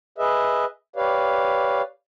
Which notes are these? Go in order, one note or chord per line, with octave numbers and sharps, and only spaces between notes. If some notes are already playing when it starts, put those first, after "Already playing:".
G#4 B4 D#5 E5
G4 B4 C#5 D5 F5